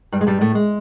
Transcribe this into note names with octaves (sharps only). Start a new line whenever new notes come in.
G2 G3
G#3
G2 G3
A2 A3
G#3